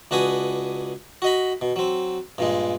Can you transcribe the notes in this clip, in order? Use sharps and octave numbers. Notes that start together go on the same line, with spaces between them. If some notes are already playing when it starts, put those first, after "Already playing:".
C#2 D4 F#4 B4 G#5 D#6
F#4 D#5 B5
B2
F#3 C4
G2 A#2 G#3